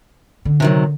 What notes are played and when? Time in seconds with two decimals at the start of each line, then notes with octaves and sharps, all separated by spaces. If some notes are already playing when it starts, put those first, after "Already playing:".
0.45 D3
0.60 C3 D#3 F#3